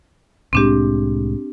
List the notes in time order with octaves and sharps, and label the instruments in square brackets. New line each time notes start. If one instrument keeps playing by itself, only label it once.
[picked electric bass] C2 A2 G#3 [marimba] C4 D4 G4